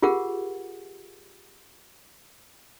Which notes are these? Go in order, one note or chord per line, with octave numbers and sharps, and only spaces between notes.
F4 G4 G#4 A#4 F#5